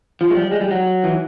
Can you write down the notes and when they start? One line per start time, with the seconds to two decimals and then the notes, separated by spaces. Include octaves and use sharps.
0.21 F3
0.30 G#3
0.35 G3
0.51 G#3
0.61 G3
0.71 F#3
1.04 E3